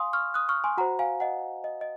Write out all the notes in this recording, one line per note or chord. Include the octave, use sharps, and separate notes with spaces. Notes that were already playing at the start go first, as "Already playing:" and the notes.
Already playing: F5 G#5 C6 D#6
C#6 F6
D#6 F#6
C#6 F6
G#5 C6
F#4 C5 F#5 A#5
F5 G#5
D#5 F#5
D#5
D#5